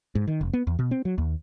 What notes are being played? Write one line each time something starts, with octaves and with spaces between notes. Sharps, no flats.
G#2
D#3
F1
B3
E2
B2
C4
F#3
D#2